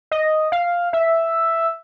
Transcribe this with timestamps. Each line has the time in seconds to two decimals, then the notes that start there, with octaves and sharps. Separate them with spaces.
0.11 D#5
0.52 F5
0.93 E5